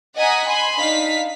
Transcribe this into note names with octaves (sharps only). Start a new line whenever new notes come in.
D#5 F#5 G#5 A#5 D#6 B6
G#5 B5 C6
D4 D#4 F5 B6